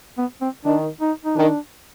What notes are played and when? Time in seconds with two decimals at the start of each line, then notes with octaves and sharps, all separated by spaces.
0.18 B3
0.41 C4
0.65 D#3 D4
1.01 D#4
1.25 D#4
1.37 D#3 D4